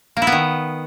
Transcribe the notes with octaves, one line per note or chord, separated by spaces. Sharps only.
A#3
E4
B3
D#3